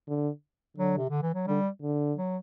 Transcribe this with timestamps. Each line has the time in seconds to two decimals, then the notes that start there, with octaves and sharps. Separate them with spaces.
0.08 D3
0.77 D3 F#3
0.97 C3
1.10 D3
1.22 E3
1.34 F#3
1.47 D3 G3
1.82 D3
2.16 F#3